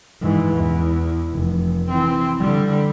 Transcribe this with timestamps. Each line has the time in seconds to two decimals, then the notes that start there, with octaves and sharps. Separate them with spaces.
0.21 G#2 E3
0.56 E2
1.34 F1
1.89 E3 C4
2.40 D3 G3